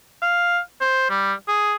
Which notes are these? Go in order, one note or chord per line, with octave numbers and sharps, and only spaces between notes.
F5
C5
G3
G#4